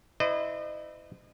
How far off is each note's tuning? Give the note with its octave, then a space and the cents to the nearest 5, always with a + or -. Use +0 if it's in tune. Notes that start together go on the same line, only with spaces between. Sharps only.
E4 -15 C5 -40 D#5 -35